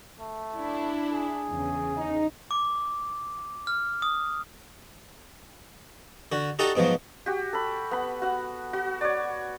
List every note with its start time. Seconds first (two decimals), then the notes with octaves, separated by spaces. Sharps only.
0.20 A3
0.57 D4 E4
1.12 G#4
1.50 E2 C#3
1.97 D#4
2.51 D6
3.67 F6
4.02 D#6
6.32 D3 F#4
6.59 D#4 F#4 G4 A4 D5 D#5
6.76 G#2 B2 F3 F#3
7.26 F#4 G4
7.53 A4 B5
7.91 B3 B5
8.22 F#4 F#5
8.73 F#4
9.01 C#5 D5